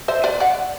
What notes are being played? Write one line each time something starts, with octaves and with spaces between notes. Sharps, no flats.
C5 E5
B4 D5
D5 F#5